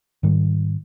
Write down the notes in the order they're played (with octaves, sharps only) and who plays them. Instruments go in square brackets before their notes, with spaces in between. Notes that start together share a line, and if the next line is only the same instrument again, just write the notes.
[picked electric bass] G#2 D#3 G3